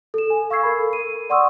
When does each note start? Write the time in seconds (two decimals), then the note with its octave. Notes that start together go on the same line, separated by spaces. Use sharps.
0.14 A4 E7
0.30 G#5
0.50 F5 C#6 E6 G#6 C7
0.63 A4 A#4 B5
0.93 A#4 D#7
1.30 D5 F#5 C6 C#6 D#6 E6